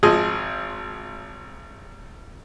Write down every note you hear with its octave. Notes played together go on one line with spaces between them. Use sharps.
G#1 F3 G#4 D#5